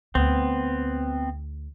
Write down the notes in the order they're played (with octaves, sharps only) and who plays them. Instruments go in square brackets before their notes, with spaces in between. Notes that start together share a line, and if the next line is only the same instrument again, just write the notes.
[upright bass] D2 [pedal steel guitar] B3 C4